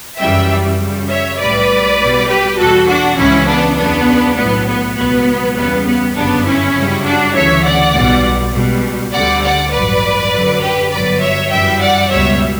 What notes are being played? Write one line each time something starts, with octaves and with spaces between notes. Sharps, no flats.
F#2 C#3 E3 G3 E5 G5
F#2 C#3 G3
C#5 E5
B1 A2 G3 B4 D5
B1 B2 G3
G4 B4
E2 B2 G3 F#4 A4
D4 F#4
C#2 C#3 E3 C#4 E4
B3 D4
E2 C#3 F#3 B3 D4
B1 A2 F#3 B3
B3
C#2 B2 F#3 B3
E2 C#3 G3 B3
B3
G1 F#2 C#3 B3 D4
C#4 E4
F#2 C#3 G3
D4 F#4
D2 C#3 E3 C#5 E5
D5 F#5
B1 B2 G3
C#2 B2 G3
D2 D3 G3 D5 F#5
D5 F#5
A1 G2 F#3 B4 D5
F#2 D3 F#3
G4 B4
G1 G2 F#3 B4 D5
C#5 E5
F#2 E3 G3 E5 G5
D5 F#5
C#2 B2 G3 C#5 E5